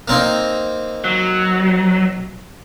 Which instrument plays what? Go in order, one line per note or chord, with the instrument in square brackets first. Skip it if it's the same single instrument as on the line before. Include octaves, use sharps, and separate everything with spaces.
[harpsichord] A#3 C4 D#4
[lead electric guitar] F#3